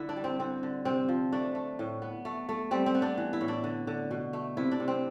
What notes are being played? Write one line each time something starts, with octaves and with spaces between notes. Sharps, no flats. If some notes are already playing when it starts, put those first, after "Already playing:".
Already playing: D3 E4
D4
G3
C4
D3 C4
D3
C3 C4
F3
A3 D4
A3
A2
B3
A3
A3
G3 C4
C4
B3
D4
E3
E4
A2
D4
D3
D3
B2
A3
C3 E4
D4
C3
C4